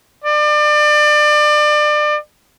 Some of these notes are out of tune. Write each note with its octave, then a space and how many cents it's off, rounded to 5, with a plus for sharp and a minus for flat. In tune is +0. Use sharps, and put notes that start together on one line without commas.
D5 +30